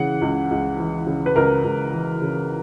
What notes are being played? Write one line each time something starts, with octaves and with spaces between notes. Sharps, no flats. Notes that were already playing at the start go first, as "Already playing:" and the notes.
Already playing: C#3 E3 F#5
C#2
C#2
E3
C#3
B4
C#2 A#4
C#2
E3
C#3